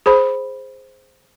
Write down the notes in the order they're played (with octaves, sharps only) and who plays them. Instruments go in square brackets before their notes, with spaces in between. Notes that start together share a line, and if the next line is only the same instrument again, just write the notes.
[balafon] G#4 C5 B5